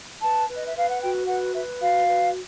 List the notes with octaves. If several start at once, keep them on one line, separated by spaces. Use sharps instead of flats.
B4 A5
B4
D#5
E5
B4 F5
F#5
F#4 G5
B4 F#5
B4 E5
F#4 F5
B4